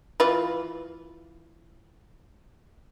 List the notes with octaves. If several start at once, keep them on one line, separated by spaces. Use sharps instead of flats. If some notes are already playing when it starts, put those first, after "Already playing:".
E3 F4 B4